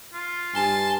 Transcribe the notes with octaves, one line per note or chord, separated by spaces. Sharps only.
F4
G2 G#5 A5 C6